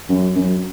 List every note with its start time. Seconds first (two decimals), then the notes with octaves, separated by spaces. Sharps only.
0.09 F#2
0.36 F#2